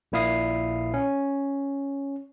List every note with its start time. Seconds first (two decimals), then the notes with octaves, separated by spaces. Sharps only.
0.12 A#1 A#2 E4 F5 D#6 C7
0.94 C#4